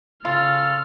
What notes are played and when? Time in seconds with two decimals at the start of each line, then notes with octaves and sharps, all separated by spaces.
0.25 C#3 F4 A4 F6